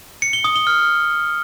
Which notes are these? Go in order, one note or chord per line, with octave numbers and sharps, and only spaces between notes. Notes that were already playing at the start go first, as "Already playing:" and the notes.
C#7
G7
D#6
G7
F6